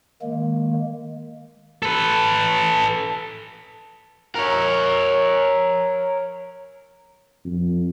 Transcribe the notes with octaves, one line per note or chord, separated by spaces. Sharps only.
D#3 G#3 A#3
A4 B4
A#4 C#5
F2